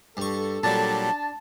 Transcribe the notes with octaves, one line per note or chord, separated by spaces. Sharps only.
G2 A4 C#6
A#2 F#3 G3 D4 A5